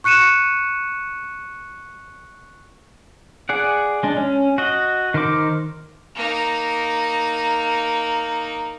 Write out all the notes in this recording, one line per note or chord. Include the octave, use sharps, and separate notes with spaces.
C#6 F#6 C#7 D#7 E7
G#4 D5 F#5
G#3 D4
C#4
F#4 D#5
D#3 A#4 C5 D6
A#3 D#4